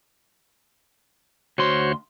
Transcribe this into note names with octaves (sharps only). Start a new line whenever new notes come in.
D2 F#4 C5 C#5 C6